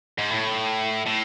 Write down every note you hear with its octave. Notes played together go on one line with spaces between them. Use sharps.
G#2
A2
A2